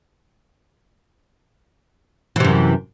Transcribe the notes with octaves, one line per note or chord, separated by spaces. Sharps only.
F#2 C3 E3